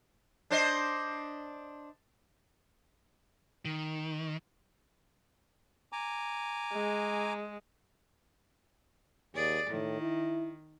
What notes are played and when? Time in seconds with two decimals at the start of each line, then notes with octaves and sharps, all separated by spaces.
0.50 D4 C5 D#5
3.65 D#3
5.92 G#5 A#5 D6
6.72 G#3
9.35 D#2 G#4 D5
9.70 A2 D#3
10.01 E4